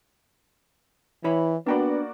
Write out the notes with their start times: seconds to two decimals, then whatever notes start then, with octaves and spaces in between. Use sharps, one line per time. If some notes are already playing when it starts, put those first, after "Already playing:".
1.24 E3 E4 C#5 B5
1.67 A#3 B3 D4 F#4 D5 G5 B5